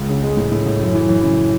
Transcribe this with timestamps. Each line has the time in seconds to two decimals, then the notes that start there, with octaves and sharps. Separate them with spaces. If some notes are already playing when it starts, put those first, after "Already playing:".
Already playing: C#2
0.09 C#3
0.23 G#3
0.37 A2
0.52 A2
0.66 A2
0.81 F#2
0.94 E3
1.09 E3
1.23 C#3